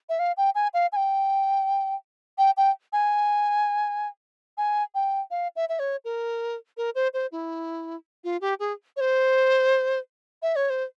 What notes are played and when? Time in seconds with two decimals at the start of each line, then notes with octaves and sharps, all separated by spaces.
0.09 E5
0.19 F5
0.37 G5
0.55 G#5
0.74 F5
0.92 G#5
0.96 G5
2.38 G5
2.57 G5
2.93 G#5
4.58 G#5
4.95 G5
5.31 F5
5.56 E5
5.69 E5
5.79 C#5
6.05 A#4
6.77 A#4
6.95 C5
7.14 C5
7.32 E4
8.24 F4
8.41 G4
8.60 G#4
8.97 C#5
9.00 C5
10.42 E5
10.56 C#5
10.70 C5